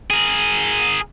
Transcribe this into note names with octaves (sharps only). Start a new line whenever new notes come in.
G#4 A#4